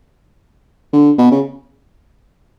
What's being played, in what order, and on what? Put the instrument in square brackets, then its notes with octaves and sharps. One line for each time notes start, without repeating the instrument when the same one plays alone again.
[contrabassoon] D3
B2
C#3